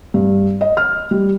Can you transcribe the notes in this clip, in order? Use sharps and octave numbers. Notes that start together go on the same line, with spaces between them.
G2
D#5
F6
G3